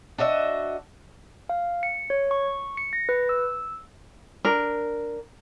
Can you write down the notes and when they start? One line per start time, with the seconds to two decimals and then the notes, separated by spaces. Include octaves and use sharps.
0.18 D4 F#4 D#5 E5
1.49 F5
1.83 C#7
2.10 C#5
2.31 C#6
2.77 C#7
2.93 A#6
3.09 B4
3.29 E6
4.45 D4 A#4